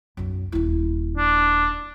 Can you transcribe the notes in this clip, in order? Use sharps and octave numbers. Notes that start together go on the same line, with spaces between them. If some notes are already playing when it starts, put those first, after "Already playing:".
B1 F#2
D#1 E4
D4